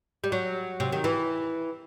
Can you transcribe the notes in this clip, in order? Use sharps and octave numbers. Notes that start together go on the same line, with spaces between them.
G3
F#3
C3
D#3
E3